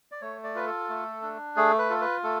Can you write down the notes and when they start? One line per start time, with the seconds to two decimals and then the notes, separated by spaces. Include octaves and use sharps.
0.12 D5
0.21 A3 C#5
0.44 D5
0.55 F4 B4
0.66 A4
0.89 A3
1.22 D4
1.56 A3 G#4
1.79 B4
1.90 F4 A4
2.01 B4
2.24 A3 A4